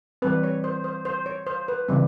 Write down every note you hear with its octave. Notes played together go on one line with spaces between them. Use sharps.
E3 G3 C4 B4
C#5
C5
C5
C5
C#5
C5
B4
C#3 E3 G3 C4